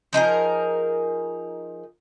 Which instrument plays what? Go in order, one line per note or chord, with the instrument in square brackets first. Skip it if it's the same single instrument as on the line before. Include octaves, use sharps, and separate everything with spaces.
[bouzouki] F3 D#4 G#4 A#4